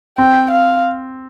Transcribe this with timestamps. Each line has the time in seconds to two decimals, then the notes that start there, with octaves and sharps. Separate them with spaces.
0.18 C4 G5
0.51 F5